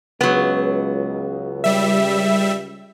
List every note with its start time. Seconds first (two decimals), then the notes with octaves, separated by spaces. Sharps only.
0.21 C#2 F#3 B3
1.64 G3 E5